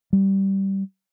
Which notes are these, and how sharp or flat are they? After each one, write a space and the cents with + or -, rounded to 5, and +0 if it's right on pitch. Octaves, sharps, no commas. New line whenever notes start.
G3 -10